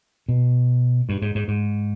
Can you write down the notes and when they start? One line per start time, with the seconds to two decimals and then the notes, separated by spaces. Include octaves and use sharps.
0.28 B2
1.09 G2
1.22 G#2
1.35 G#2
1.48 G#2